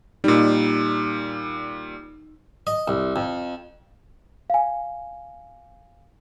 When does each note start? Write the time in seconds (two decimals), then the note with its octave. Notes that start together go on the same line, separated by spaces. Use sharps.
0.24 A#2 G3 D#4
2.67 D#5
2.88 C2
3.16 F2
4.50 F5 G#5